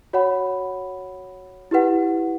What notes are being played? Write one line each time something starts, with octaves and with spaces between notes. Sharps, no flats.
F#4 C#5 F#5 B5
E4 G4 B4 F#5